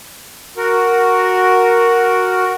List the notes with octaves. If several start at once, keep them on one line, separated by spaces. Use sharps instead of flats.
F#4 A#4